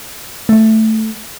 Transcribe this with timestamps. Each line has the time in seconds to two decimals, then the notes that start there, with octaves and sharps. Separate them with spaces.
0.49 A3